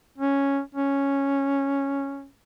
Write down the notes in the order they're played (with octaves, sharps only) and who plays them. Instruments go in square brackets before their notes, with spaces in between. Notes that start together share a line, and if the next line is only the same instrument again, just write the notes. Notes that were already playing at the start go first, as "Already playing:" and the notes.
[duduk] C#4
C#4